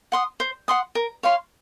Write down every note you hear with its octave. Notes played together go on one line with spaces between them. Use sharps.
F#5 C6 D#6
C5
F#5 C6 D#6
A#4
C#5 F5 C6